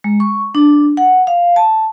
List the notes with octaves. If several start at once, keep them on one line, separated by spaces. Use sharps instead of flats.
G#3
C#6
D4
F#5
F5
A5